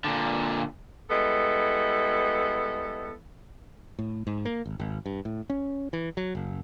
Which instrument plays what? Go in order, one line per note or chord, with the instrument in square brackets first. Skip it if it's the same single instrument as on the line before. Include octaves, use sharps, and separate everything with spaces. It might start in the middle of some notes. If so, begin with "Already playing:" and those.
[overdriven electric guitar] A#2 D3
[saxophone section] G3 G#3 B3 E4 A4
[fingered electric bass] A2
G#2
A#3
G#1
G#1
G2
A2
C#4
E3
F#3
F#1